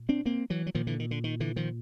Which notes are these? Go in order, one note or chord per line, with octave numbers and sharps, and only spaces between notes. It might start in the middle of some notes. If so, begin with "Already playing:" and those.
Already playing: A#2
C4 D4
A#3 C4
E3 F#3
F#3
A#2 D#3 F3
D3 E3
D#3
D3
D#3
D3 E3
D#3 F3